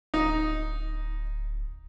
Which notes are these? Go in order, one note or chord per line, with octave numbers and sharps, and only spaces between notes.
D1 D#4